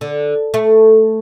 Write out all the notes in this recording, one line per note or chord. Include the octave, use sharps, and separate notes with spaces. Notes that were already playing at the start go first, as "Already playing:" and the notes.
D3
A3